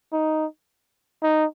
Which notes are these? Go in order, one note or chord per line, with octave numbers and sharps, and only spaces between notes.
D#4
D#4